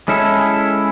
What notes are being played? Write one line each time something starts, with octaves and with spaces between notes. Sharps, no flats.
G#3 C#4 E4 A4